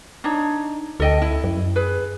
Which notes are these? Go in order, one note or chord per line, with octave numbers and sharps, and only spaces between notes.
D4 D#4 C#5
D2 A4 D#5 G5
E4
F#2
G#4 B4